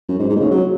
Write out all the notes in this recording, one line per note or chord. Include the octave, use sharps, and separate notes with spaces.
F#2
G#2
G#2
A#2
C#3
F#3